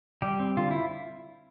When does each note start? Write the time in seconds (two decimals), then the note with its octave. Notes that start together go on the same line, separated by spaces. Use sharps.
0.22 G3 G4
0.39 C4
0.57 D3 F4
0.71 E4